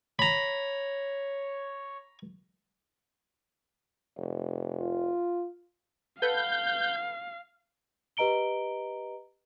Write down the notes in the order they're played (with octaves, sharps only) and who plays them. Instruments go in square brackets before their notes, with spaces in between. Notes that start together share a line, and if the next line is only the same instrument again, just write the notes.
[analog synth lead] C#5 [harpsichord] A#5 B5
[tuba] F1
[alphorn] F4
[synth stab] A4 B4 F#5 [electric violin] F5 [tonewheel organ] G6
[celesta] G4 B4 D#5 A#5 D7 G7